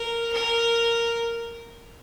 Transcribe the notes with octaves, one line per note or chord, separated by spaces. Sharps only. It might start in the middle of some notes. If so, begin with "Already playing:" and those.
Already playing: A#4
A#4